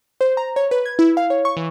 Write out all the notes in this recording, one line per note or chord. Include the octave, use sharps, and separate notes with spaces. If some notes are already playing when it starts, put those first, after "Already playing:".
C5
A#5
C#5
B4
G#6
E4
F5
C#5
C#6
E3